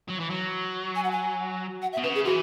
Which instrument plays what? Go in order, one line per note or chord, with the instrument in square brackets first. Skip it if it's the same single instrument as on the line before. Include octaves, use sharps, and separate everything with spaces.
[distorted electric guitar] F#3
E3
F#3
[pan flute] G#5
F#5
G#5
F#5
E5
[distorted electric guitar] B2
[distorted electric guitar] C#3 [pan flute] B4
[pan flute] G#4
[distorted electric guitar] E3 [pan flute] F#4